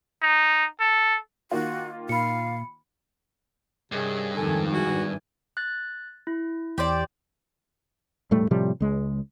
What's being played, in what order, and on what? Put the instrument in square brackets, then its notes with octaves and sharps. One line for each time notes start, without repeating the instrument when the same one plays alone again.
[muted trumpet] D#4
A4
[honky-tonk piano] D#3 A#3 F4 [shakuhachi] F#4
[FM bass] A#2 [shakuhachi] F5 [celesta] B5 C#7
[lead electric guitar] G2 [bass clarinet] C3 [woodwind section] D#3 C#4 G#4
[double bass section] F2 G#2 D#3 [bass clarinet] A4 [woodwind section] G#5
[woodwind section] E2 G#5 [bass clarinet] F#4
[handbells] F#6 A6
E4
[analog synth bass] E2 [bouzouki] G4 C5 D5
[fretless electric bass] E1 A2 G3 A3
A2 C3 F3 G3
C#2 G#3